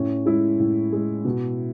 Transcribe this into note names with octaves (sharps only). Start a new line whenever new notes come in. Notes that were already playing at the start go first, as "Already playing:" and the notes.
Already playing: A2 C#4
G#3 E4
A2
G#3
B2